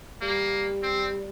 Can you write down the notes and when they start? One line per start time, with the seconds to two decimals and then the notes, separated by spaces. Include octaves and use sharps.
0.21 G3 A#3
0.83 C4